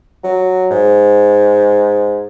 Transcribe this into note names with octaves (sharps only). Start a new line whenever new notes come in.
F#3
G#2